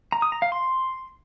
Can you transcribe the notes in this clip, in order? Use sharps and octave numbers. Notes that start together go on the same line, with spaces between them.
A#5
D#6
A#5
F5
C6